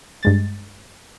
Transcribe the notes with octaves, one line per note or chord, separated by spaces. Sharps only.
G2 G#3 A6